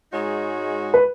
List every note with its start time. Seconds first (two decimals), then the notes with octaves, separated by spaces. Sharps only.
0.11 G#2 G#3 D#4 F#4 C#5
0.94 B4